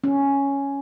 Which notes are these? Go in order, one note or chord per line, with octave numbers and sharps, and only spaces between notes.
C#4